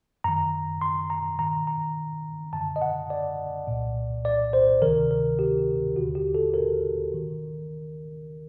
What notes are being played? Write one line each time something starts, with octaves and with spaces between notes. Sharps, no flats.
F#2 D#3 A#5
C6
A#5
G2 D#3 A#5
A#5
F#2 D3 A5
D#5
F#5
D5
C2 A#2
D5
C5
D2 C3 D#3 A#4
A#4
G4
D#2 D3 F#4
G4
A4
A#4
D#3